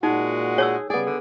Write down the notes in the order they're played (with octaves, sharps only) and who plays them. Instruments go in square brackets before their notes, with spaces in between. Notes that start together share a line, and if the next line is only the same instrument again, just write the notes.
[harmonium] A#2 F#4 F#5 [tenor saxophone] G#3 [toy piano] D#4
[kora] G#4 [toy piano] C#5 A5 E6
[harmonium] C#3 G3 [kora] B3 G#4 [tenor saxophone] D5
[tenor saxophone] D3